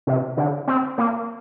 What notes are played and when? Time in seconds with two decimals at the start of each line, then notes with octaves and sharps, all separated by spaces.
0.07 C3
0.37 D3
0.67 C4
0.98 A#3